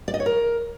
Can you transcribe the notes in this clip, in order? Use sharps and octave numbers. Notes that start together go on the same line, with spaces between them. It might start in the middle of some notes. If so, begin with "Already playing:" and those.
D5
D#5
C#5
A#4